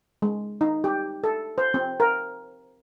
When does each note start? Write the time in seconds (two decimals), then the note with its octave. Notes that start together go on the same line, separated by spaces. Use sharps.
0.22 G#3
0.61 D#4
0.84 G4
1.24 A4
1.58 C5
1.74 C4
2.00 A#4